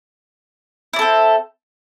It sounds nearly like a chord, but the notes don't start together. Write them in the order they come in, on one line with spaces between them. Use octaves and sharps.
E4 D5 A4 C4